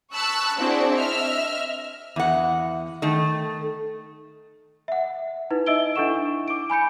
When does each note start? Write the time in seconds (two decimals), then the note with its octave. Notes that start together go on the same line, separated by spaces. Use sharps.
0.13 A5 B5 C#6 E6 F#6
0.58 C4 D4 E4 F#4 G#4 D5
0.94 D#5 E5 F6
2.16 E2 F#5
3.02 D#3 A3
4.88 E5 F#5
5.50 D#4 E4 B4
5.66 D#4 D#5 E5 E6 D7 G7
5.96 D4 E4 A4 F#5 C#6 E7
6.48 D6 D7
6.70 G#5 B5 G6 C#7